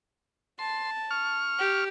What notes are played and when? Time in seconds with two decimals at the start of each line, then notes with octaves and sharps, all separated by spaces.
0.59 A5 C6
1.11 C#6 F6
1.59 G4